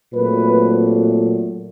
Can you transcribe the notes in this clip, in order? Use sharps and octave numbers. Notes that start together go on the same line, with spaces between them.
A#2 F#3 A3 C4 B4